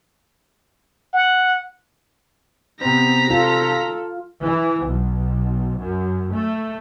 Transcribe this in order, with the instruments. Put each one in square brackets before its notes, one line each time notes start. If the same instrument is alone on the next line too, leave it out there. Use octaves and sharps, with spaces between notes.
[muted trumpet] F#5
[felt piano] C3 C4 [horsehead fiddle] B3 [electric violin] A#5 B6
[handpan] F4 [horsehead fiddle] A4
[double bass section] E3
B1
F#2
A3